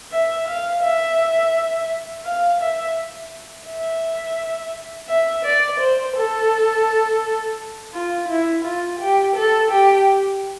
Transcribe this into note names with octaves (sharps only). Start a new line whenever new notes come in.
E5
F5
E5
F5
E5
E5
E5
D5
C5
A4
F4
E4
F4
G4
A4
G4